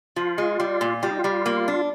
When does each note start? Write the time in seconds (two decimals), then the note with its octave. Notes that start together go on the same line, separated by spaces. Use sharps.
0.16 F3 F4
0.38 G#3
0.60 G3
0.81 A#2
1.03 G3 F4
1.11 D#4
1.18 F4
1.24 G3
1.46 A#3
1.68 D4